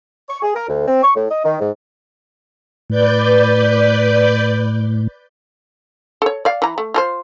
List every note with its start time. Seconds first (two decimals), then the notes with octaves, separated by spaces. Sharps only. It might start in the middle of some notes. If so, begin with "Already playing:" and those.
0.28 C#6
0.42 G#4
0.55 A#4
0.68 D2
0.87 C4
1.02 C#6
1.15 A2
1.30 D#5
1.44 D#3
1.60 G#2
2.90 A2 B4 D5 G6
6.22 A4 C#5
6.45 D5 F5
6.62 E3 A#5
6.78 A3
6.94 F4 A4 C5